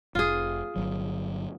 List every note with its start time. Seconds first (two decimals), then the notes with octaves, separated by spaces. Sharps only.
0.15 F1 F4 G#4
0.76 G1 C2 F#3